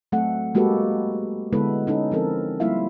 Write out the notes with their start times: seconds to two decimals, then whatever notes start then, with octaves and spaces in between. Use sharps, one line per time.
0.12 F#3 A3 C4 A4 F#5
0.55 G#3 A#3 F#4 G4 A4 B4
1.53 D3 G#3 B3 E4 A4 B4
1.87 C#4 D#4 A4
2.12 F3 C4 A4 A#4
2.60 G3 A#3 E4 F4 E5 F5